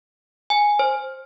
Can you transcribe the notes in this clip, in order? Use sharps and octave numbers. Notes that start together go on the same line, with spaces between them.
G#5
C5